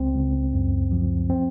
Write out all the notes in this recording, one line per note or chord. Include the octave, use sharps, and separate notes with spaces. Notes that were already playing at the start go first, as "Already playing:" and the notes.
Already playing: C#2 C4
C#2
F#2
F3
C4